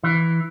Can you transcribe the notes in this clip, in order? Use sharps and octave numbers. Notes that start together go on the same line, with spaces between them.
E3